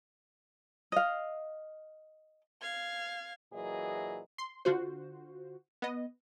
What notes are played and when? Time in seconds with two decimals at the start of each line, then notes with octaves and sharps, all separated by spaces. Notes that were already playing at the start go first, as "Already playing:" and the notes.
0.92 D#5 F5
2.62 F5 G#6
3.52 A#2 E3 F#3 G#4 D#5
4.38 C6
4.65 D3 F4 F#4 C5
5.82 B3 D#5